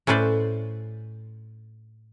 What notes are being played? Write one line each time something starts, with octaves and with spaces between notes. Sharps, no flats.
A2 C#4 B4 C5 D5